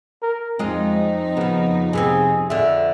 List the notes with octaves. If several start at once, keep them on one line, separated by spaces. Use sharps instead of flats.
A#4
F2 G#3 C4 D#4 F4 D#5
C#3 F3 B3
C3 B3 C4 G#4
F2 D3 E5